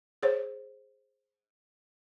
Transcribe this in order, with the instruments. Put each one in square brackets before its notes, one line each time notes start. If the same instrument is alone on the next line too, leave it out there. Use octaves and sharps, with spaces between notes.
[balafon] G#4 C5 C#5